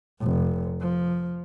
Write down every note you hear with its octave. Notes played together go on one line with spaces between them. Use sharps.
F1
F3